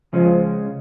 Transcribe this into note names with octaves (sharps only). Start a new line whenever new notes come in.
C#3 F3 G#3 C#4